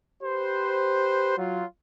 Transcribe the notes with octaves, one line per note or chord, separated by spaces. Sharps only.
G4 B4 C5
F#3 F4